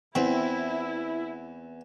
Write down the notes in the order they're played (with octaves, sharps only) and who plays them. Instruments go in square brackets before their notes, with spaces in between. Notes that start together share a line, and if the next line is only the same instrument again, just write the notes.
[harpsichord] E2 [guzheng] C4 [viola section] E4